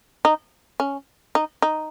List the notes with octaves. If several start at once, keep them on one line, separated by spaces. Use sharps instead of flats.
D#4
C#4
D#4
D#4